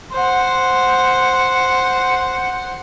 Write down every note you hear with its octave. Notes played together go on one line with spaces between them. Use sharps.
C5 F#5